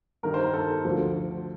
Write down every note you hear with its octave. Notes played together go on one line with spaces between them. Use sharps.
G2 D#3 G3 A#4
C5
A#4
A4
D2 D3 F3